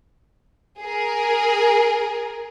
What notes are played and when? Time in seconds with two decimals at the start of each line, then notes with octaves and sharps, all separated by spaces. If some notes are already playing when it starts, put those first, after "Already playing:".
0.82 G#4 A#4